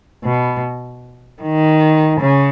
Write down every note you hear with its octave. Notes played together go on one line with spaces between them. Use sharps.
B2
D#3
C#3